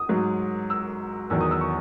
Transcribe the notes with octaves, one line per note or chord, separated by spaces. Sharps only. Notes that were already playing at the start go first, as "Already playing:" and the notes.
Already playing: D#6
G#2 F#3
E6
E2 D#3 F#3 E6
D#6
E6
C#6